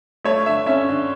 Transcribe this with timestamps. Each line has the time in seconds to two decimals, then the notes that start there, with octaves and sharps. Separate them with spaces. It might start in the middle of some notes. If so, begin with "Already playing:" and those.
0.25 A3 C#5
0.46 D3 E5
0.66 C#4 E5
0.89 D3